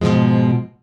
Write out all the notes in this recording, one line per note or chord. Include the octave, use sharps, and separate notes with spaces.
G#2 B2 D3 F3 G#3